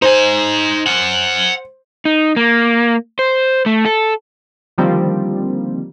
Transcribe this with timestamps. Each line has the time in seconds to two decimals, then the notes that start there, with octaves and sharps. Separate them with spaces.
0.02 D#4 C5 G#5
0.86 F#5 G#5
2.05 D#4
2.36 A#3
3.19 C5
3.66 A3
3.86 A4
4.78 D3 D#3 F3 G3 A#3 C4